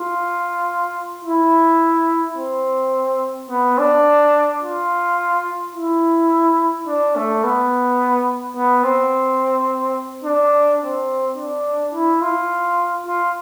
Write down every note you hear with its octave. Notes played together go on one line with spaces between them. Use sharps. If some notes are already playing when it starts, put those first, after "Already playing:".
Already playing: F4
E4
C4
B3
D4
F4
E4
D4
A3
B3
B3
C4
D4
C4
D4
E4
F4
F4